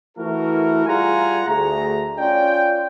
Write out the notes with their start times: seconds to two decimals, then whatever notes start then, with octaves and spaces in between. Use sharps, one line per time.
0.18 E3 A3 E4 F#4 A#4
0.86 G3 F4 G#4 F#5 G#5 A#5
1.47 D2 A3 G#4 A#5
2.19 C#4 F4 D5 G5